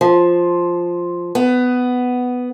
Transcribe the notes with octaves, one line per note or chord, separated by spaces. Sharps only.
F3
B3